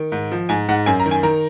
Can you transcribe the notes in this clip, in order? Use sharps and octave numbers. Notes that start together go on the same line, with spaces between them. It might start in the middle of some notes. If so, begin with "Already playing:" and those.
Already playing: D#3
G#2
F3
G#2 G#5
G#2 F#5
F#2 G#5
A#5
D#3
G#5
D#3 A#5